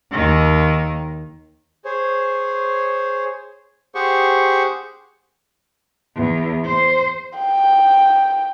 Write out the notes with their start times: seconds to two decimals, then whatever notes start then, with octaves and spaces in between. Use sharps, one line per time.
0.12 D#2 D#3
1.85 G#4 C5 C#5
3.95 G4 G#4 C5 F#5 C#6
6.16 E2
6.65 C5
7.39 G5